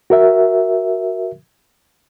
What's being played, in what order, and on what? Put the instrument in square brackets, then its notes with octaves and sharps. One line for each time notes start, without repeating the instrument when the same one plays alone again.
[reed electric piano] F#4 A#4 E5